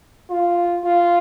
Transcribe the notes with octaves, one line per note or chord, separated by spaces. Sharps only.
F4
F4